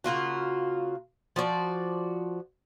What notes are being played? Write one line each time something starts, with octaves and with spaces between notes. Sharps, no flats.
C#3 A#3 F4 F#4
F3 F#4 C#5 D5